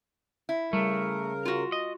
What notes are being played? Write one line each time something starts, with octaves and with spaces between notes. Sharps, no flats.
E4
C#3 G3 A3 A#4
F4 F#4
D#5